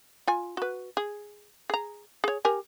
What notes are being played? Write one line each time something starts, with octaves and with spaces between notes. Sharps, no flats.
F4 G#5
F#4 B4
G#4
G#4 A#5
G#4 C#5
G4 A#4 G#5